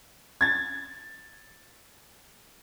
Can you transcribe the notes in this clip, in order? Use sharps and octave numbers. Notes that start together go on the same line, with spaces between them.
G#6 A6